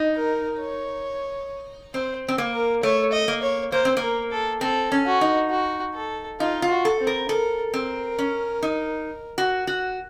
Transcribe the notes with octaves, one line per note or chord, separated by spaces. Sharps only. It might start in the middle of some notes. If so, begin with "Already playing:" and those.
Already playing: D#4
A#4
C#5
C4 C5
C4
A#3
A#4
A3 C#5
D#5
A#3
C#5
A#3 C5
C4
A#3
A#4
A4
C4 A4
C#4
F#4
D#4
F#4
A4
D#4 F4
F4
F#4
A4
C4
A#4
A4 A#4
C4 A#4
C#4
D#4
F#4
F#4